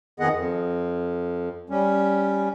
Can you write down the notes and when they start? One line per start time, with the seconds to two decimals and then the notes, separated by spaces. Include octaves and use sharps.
0.20 F2 D#3 B3 G#4 D#5 F#5
0.34 F2
1.70 G3 C#4